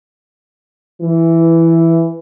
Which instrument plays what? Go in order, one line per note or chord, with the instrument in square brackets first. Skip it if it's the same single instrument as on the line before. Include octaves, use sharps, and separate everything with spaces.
[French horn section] E3